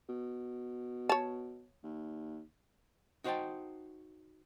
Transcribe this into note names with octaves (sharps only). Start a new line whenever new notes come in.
B2
C#5 A5
D#2
D#4 F#4 C5 F5 G5 A5